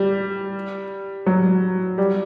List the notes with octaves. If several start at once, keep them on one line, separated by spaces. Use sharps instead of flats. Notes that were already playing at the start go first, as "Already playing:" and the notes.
Already playing: G3
F#3
G3